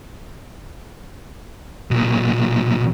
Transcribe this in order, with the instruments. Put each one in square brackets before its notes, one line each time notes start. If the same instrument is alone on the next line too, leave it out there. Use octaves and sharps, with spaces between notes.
[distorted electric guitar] B1 A#2